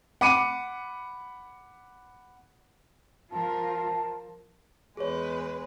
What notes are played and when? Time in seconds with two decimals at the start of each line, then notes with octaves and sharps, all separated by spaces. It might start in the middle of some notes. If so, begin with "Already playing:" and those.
0.21 F#5 B5 D6 C#7 D#7
3.31 F3 F4 A#4 A5
4.97 E2 G#3 G#4 B4 C#5